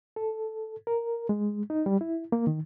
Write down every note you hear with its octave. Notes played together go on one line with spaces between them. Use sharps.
A4
A#4
G#3
D#4
G3
E4
A#3
D#3